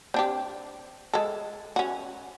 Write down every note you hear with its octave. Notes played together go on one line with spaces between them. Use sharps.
C4 D4 G4
G#3 A4
C#4 F#4